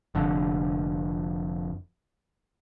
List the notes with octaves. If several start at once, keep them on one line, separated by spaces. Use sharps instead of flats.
F1 F2 D3